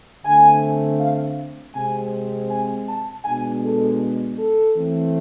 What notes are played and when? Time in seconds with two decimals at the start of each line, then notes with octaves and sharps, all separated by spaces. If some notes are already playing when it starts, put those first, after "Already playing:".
0.25 D3 A3 C4 G#5
1.01 F5
1.75 C3 G#3 C4 G#5
2.50 G#5
2.88 A5
3.25 B2 G#3 D4 G#5
3.62 A4
4.37 A4
4.75 E3 A3 C4